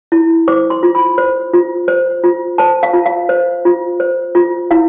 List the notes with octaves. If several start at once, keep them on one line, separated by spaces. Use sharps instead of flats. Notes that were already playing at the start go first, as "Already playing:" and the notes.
E4
C5 D6
C6
F4
B5
C5
F4
C5
F4
C5 A5
F5
F4
F5
C5
F4
C5
F4
E4 F5